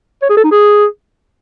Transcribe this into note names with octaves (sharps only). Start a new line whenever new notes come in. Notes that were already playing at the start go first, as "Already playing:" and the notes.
C#5
G#4
A4
D#4
G#4